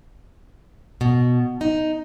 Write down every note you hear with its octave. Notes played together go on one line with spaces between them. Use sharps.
B2
D#4